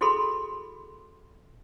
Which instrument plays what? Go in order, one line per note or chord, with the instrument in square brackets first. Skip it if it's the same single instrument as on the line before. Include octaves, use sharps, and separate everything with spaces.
[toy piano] E4 F#4 G#4 A4 B5 C6